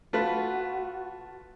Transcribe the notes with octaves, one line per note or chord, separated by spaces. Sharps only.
A3 F4 F#4 B4